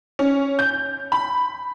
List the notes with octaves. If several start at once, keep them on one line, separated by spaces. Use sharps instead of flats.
C#4
G6
B5